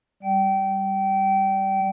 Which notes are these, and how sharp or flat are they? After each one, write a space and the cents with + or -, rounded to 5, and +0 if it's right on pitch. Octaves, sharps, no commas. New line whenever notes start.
G3 +0 G5 -25